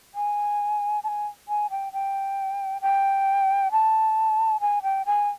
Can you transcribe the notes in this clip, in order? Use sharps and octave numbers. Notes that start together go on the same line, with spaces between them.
G#5
A5
G#5
G#5
G5
G5
G5
A5
G#5
G5
G#5